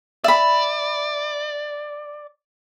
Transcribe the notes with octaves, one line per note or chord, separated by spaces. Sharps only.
D5 E5 B5